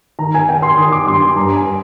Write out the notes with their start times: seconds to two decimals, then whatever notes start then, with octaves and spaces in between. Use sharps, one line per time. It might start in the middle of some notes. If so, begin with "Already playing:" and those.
0.19 D#3 A#5
0.34 G#5
0.49 G5
0.62 C6
0.78 D#3 D#6
0.92 D6
1.07 G2 C6
1.21 C6
1.36 G2 A#5
1.56 G#5